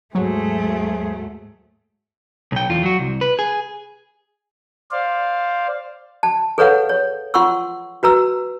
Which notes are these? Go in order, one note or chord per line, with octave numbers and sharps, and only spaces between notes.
D#2 G#2 F#3 G#3 A3 G#4 C5
B1 G5
E2 F4
F#3 F#4
C2
B4
G#4
C5 D5 F5
A5
G#4 A4 B4 C#5 F5 F#5
C#5
F4 F#5 C6 C#6 E6
F#4 B4 A#5 E6